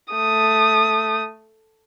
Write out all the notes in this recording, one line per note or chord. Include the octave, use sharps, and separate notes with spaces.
A3 D#6